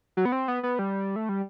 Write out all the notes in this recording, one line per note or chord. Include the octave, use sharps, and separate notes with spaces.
F#3
B3
C4
B3
B3
G3
A3
G3